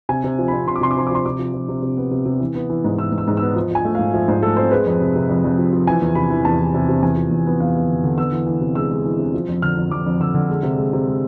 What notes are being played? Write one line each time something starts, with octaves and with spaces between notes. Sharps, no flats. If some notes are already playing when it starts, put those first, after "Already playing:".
C3 G#5
C3
F3
C4 B5
C3 C6
D6
C3 C6
D6
F3 C6
D6
F3 C6
C3 D6
F3
F3
C3
C3
B3
C3
C3
E3
B3
E3
G#2
E3 E6
G#2
E6
G#2
B3 E6
F3
F3 G#5
A3
G#2 F5
F3 E5
G#2 C5
A3 A4
C4 C5
G#3 B4
F2
C3
C3
F2
F2
F3
F3
E3 G#5
E2
C3 B5
E3
E2 A5
E3
C3
C3
E2 G#5
F3
E2
B3
E2 F5
B3
D3
D3
B3 E6
E3
E3
C3
G#3 E6
G#3
E3
C3
F3
F2
D3 F6
F2
F2 D6
F2
D3 E6
D3
G#3
C3
G#3
C3
G#3